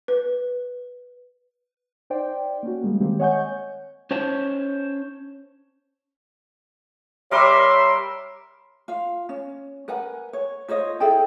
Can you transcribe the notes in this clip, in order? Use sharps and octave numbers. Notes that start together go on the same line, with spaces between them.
B4
D#4 C5 D5 G5
A#3 C#4 F#4
G3 G#3 A#3
D#3 G#3 A#3 C4 G4
C#5 D#5 F#5 G#5 C#6 G6
C#4 C5 C#5 A5
G3 A#4 C#5 E5 C6 D6
F4 F5
C#4
A#4 B4 F#5 G#5
C#5
F4 C5 C#5 D#5
E4 G#4 A4 G5